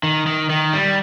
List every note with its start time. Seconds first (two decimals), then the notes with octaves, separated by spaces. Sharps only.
0.03 D#3
0.27 D#3
0.50 D#3
0.73 G3